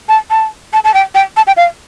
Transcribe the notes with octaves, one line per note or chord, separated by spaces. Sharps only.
A5
A5
A5
A5
G5
G5
A5
G5
F5